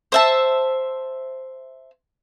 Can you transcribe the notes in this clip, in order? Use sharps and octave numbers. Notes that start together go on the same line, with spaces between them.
C5 E5 A5